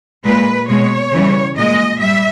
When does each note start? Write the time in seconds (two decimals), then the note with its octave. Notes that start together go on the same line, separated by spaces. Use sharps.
0.24 A#2 G#3 B4
0.68 B2 G#3 C#5
1.13 C#3 E3 G3
1.56 A#2 G#3 D#5
2.00 G3 E5